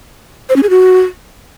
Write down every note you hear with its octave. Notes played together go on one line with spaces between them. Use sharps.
C5
C#4
G#4
F#4